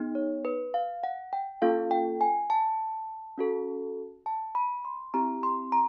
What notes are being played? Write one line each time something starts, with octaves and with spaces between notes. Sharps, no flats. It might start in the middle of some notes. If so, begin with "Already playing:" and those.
Already playing: B3 D#4 G#4
C#5
B4
F5
F#5
G5
A#3 C#4 F4 A4 F5
G5
G#5
A5
C#4 F#4 A4
A5
B5
C6
C4 E4 G4 A#5
C6
A#5